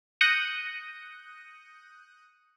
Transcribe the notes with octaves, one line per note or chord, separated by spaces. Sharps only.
D#6 F#6 G6 A#6 C#7 D#7